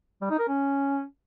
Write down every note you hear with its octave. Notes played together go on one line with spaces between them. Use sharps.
G3
D#4
A#4
C#4